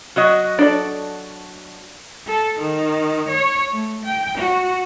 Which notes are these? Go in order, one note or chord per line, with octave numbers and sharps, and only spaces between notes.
F#3 F#4 D#5
D4 A4 D5
A4
D#3
C#5
A3
G5
F#4